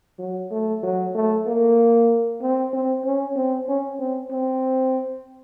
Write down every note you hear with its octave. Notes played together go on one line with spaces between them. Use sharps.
F#3
A3
F#3
A3
A#3
C4
C4
C#4
C4
C#4
C4
C4